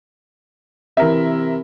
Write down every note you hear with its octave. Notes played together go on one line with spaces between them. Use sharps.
C3 E3 A#4 E5